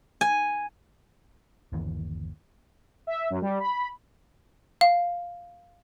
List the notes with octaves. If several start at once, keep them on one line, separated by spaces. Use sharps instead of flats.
G#5
G1 D#2 E3
E5
F#2
G3
B5
F5